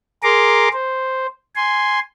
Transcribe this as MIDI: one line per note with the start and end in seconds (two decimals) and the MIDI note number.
0.23 0.68 68
0.23 0.68 70
0.23 0.68 82
0.23 0.68 84
0.23 0.68 86
0.73 1.27 72
1.56 1.99 80
1.56 1.99 84